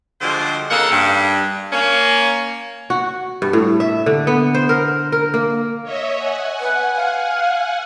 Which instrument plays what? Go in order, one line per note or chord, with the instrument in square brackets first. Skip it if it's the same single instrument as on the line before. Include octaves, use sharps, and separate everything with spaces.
[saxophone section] D3 F3 G3 G#3 F#4 C5
C#3 A#3 D#4 A4 A#4 F#5
G2
A#3 C#4
[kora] F#4
G2
A2
E5
D3
B3
C5
A#4
A#4
A#3
[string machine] C#5 D#5 E5
F#5 G#5
[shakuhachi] B4
F5